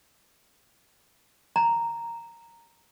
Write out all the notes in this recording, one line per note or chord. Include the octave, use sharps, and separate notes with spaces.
A#5